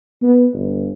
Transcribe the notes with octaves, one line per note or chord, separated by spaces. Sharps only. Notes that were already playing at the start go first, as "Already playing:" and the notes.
B3
G1